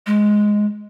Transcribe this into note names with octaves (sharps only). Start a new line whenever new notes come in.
G#3